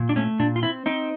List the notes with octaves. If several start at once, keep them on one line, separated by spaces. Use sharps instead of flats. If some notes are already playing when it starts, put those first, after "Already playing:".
Already playing: A#2
D4
A3 C#4
A#2 D4
F4
C4 E4
C4 D#4